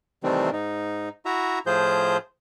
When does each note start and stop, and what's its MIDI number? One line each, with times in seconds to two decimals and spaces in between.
0.24 0.50 48
0.24 0.50 51
0.24 0.50 52
0.24 0.50 55
0.24 0.50 57
0.24 0.50 60
0.52 1.09 44
0.52 1.09 63
1.25 1.59 64
1.25 1.59 66
1.25 1.59 76
1.25 1.59 82
1.66 2.17 45
1.66 2.17 53
1.66 2.17 65
1.66 2.17 68
1.66 2.17 72
1.66 2.17 91